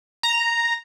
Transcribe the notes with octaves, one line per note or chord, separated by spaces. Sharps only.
A#5